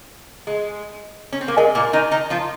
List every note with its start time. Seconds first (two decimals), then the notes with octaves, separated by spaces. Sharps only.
0.47 G#3
1.32 C#4
1.41 C4
1.48 A#3
1.57 G#3 A#4 D#5 G#5
1.75 A#2 A#3
1.93 D#3 D#4
2.11 D#3 D#4
2.30 F3 F4